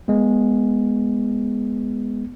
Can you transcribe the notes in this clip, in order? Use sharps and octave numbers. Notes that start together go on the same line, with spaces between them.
G#3 B3